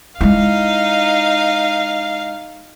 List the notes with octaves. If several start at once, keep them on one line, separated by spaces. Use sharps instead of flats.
G#3 D#4 E4 F5